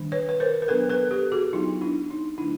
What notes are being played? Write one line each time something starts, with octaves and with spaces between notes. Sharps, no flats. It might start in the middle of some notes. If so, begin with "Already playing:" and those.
Already playing: D#3 G3 A#3 D4
B4 C#5
B4
A#4 C5
A#4
F#3 B3 D4 A4 B4
A4 B4
G4 A4
F#4 G#4
F#3 B3 D4 D#4 F4
D4 E4
D#4
D3 F#3 A3 D4 E4